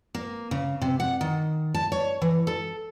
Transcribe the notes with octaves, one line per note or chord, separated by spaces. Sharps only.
A#3
C#3
C3
F#5
D#3
A5
C#5
E3
A4